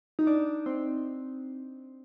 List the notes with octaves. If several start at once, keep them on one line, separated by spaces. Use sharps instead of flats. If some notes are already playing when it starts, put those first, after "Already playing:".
D#4
D4
C4